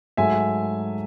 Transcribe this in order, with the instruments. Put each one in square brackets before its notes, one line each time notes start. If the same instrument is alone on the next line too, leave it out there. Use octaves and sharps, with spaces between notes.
[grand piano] G#2 F#3 A3 E5 G#5